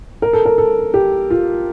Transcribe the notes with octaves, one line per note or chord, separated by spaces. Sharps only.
A#4
A4
A#4
A4
G4
F4